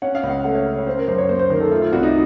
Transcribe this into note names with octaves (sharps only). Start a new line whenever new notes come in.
C#4 F#5
F5
C#2 F#5
A3 F#5
C#5
C#3
C#5
C#4 C5
A#4
F#2 C5
C#5
A#3 C5
C5
D#3 A#4
A4
A3 F4
F4
C2 F#4
D#4